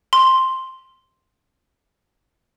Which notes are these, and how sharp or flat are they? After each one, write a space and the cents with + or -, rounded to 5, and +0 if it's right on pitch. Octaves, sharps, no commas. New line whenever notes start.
C6 +5